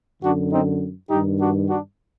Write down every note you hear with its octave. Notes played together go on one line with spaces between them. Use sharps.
F#2 D3 D4 F#4
C4 D#4
G2 D#3 D#4 G4
D4 F#4
D4 F#4